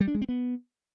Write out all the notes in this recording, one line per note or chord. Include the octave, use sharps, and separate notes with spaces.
G3
D4
G#3
C4
B3